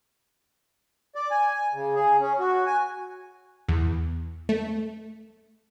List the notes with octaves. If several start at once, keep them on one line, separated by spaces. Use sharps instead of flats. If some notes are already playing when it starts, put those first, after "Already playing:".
D5
G#5
C#3
G#4
C#4
F#4
G#5
E2
A3